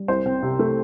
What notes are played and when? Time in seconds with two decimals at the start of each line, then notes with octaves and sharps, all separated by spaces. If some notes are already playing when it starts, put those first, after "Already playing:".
Already playing: G3
0.08 C2 C5
0.26 C4
0.43 C3
0.59 A3